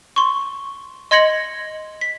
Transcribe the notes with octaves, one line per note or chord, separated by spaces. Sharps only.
C6 C#6
D#5 C6 G#6 A#6 C#7 F#7
B6